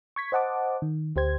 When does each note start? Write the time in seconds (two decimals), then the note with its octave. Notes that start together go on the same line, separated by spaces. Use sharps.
0.16 C#6 G#6 B6
0.32 C5 D#5 F#5 A5 D6
0.82 D#3
1.16 D2 G4 C5 G#6